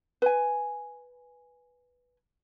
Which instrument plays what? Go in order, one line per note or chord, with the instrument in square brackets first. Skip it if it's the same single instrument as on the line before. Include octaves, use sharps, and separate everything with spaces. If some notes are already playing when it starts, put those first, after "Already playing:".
[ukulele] B4 G#5